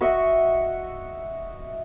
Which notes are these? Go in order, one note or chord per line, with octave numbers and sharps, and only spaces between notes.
F#4 D#5 E5 F#5